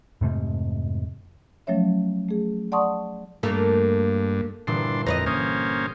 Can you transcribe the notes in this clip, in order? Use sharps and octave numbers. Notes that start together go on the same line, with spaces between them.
F2 G#2 C3 A3
F3 F#3 A3 C#4 C#5 E5
A3 G#4
D5 F#5 A5 C6 C#6 D#6
G2 A3 A#3 A4 A#4
G1 A#2 E3 D4 C6
F2 B4 C#5 D#5 A#5
A#3 C#4 C5 D#6